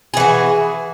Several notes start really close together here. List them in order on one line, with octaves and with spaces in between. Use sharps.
G#4 E3 F#4